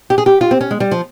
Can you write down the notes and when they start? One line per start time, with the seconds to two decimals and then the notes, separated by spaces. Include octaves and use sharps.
0.10 G4
0.18 G#4
0.26 G4
0.41 F4
0.51 C4
0.61 C#4
0.71 G#3
0.80 G3
0.91 F3